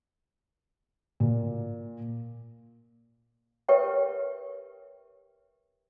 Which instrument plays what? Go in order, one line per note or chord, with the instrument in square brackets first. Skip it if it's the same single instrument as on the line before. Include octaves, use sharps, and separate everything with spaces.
[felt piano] A#2
[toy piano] G4 A#4 B4 C#5 E5 G5